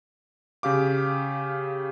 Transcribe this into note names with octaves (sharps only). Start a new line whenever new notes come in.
C#3 G4 F5 D6